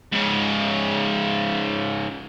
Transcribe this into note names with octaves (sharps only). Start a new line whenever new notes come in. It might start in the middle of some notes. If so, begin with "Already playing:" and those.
G#2 C#3